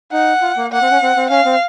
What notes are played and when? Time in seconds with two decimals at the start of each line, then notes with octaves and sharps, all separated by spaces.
0.12 D#4 F#5
0.42 F4
0.57 A#3
0.72 A#3 F#5
0.82 C4
0.91 C#4
1.02 C4
1.16 C4
1.30 C#4 F5
1.45 C4